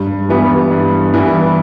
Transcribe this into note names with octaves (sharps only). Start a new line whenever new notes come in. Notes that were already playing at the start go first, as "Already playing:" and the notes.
Already playing: G2
E3 G3 B3
G2
E3 G3 B3